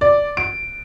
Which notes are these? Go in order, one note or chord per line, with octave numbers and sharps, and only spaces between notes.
D5
D7